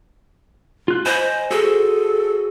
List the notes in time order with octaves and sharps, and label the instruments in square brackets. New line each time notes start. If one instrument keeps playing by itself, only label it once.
[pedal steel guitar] F4 F#6
[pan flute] C5 [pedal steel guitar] D#5 G#5 B5
[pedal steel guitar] F#4 G#4 C5 [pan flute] A4